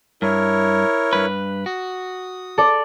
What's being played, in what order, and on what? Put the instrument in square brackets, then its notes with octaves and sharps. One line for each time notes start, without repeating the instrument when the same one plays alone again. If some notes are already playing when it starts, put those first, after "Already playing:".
[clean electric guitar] G2 [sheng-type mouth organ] E4 A#4 C#5
[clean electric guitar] G2 B4
[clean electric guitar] F#4 [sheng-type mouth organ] D#6
[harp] A4 D5